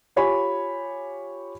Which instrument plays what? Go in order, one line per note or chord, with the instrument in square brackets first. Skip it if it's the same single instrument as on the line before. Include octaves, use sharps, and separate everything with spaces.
[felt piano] F4 G4 C#5 G#5 B5 C#6